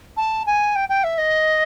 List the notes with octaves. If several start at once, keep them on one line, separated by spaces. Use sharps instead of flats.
A5
G#5
G5
G5
E5
D#5